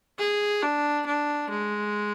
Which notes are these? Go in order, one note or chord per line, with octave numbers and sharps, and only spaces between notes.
G#4
D4
D4
G#3